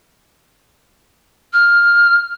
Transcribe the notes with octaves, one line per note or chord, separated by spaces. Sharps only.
F6